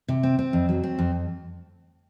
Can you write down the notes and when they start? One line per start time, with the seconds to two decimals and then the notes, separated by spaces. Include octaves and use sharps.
0.08 C3
0.23 C4
0.39 C4
0.53 F2
0.69 F#3
0.83 C4
0.99 F2